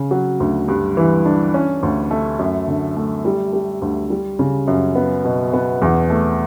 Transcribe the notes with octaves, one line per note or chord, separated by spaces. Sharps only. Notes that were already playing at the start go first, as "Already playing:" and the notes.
Already playing: C#3
F#3
D2
G2
E3
D4
C#4
D2
A3
F#2
D3
A3
G3
G3
D2
G3
C#3
F#2
B3
B2
B3
E2
A3